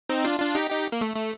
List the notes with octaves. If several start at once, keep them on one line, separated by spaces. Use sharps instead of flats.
C4 D#4
D4 F4
D4 F4
D#4 G4
D#4 G4
A#3
A3
A3